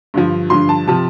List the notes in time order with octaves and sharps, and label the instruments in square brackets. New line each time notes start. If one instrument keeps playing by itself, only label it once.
[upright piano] G2 D3 F3
G2 D3 F3 C6
A5
C3 F3 A5